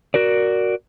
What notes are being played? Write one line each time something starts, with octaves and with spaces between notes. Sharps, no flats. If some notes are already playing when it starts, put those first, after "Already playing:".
F#4 A#4 D5